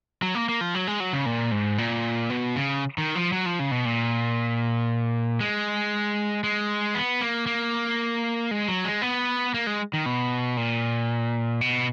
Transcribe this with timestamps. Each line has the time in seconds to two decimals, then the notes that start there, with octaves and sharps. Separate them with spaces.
0.22 F#3
0.35 A#3
0.49 A#3
0.61 F3
0.75 F#3
0.87 G#3
1.00 F#3
1.13 C#3
1.26 A#2
1.51 G#2
1.78 A#2
2.30 B2
2.56 C#3
2.98 D#3
3.15 F3
3.32 F#3
3.46 F3
3.59 C#3
3.71 B2
3.85 A#2
5.41 G#3
6.44 G#3
6.95 B3
7.21 A#3
7.46 A#3
8.51 G#3
8.68 F#3
8.85 G#3
9.02 B3
9.54 A#3
9.67 G#3
9.93 D#3
10.06 B2
10.57 A#2
11.61 B2